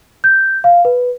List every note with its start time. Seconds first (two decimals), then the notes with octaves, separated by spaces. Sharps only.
0.24 G6
0.64 F5
0.85 B4